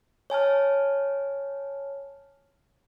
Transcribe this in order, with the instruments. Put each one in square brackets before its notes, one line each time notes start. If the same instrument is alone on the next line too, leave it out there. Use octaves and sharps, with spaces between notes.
[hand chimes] C#5 G#5 A5 F6